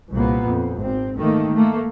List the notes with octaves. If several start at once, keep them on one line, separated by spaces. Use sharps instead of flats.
C2 A#2 A#3 B3
F2
G#1 C4
D#3 A3 A#3
A3 A#3